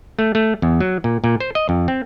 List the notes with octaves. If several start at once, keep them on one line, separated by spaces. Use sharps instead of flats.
A3
A3
E2
F#3
A#2
A#2
C5
D#5
F2
C4